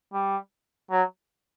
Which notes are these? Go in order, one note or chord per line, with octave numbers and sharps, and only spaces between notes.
G3
F#3